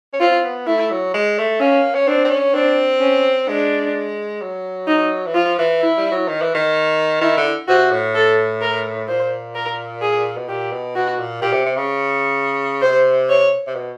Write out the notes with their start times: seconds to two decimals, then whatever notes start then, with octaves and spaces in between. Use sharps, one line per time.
0.13 C#4
0.21 C4 F4
0.44 B3
0.67 A3 E4
0.91 F#3
1.14 G#3
1.38 A3
1.61 A#3 C#4
1.95 C#4
2.07 C4 D4
2.25 C4
2.31 C#4
2.54 C4 D4
3.01 C#4
3.48 G#3 D4
4.41 F#3
4.88 D#4
5.26 E3
5.35 F3 F4
5.58 E3
5.81 E4
5.97 G3
6.12 F#3
6.28 D#3
6.42 E3
6.55 D#3
7.21 D#3 E4
7.37 D3
7.68 C3 F#4
7.92 A2
8.15 A4
8.61 A#4
9.08 A#2 C5
9.55 A#4
10.02 G#4
10.37 B2
10.49 A#2 G4
10.72 B2
10.95 B2 F#4
11.19 A#2
11.42 A#2 G4
11.53 C3
11.66 C3
11.77 C#3
12.82 C3 C5
13.29 C#5
13.67 C3
13.75 B2